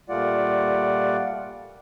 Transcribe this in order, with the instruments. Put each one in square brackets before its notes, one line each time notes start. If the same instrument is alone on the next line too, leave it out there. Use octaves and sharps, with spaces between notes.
[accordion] A#2 G3 A3 F4 D5 F#5